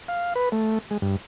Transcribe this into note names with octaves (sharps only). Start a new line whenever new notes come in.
F5
B4
A3
G#3
G2